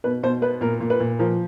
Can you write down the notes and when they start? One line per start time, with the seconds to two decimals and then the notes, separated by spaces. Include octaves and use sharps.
0.04 B2 B4
0.23 B2 C5
0.42 B3 B4
0.61 A#2 A#4
0.80 A#2
0.90 B4
1.00 A#2
1.19 F3 A#4